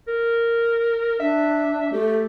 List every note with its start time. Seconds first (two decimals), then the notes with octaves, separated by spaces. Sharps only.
0.08 A#4
1.20 D4 E5
1.92 A3 G4